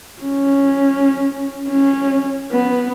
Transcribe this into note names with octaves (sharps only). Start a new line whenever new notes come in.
C#4
C#4
B3